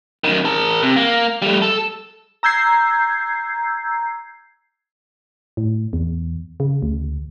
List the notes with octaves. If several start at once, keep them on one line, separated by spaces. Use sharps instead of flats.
F#2 D#3
A#4 A5
C3
A#3
G3 A3
A4
A#5 E6 G6 G#6 C7
A2
E2
C#3
D2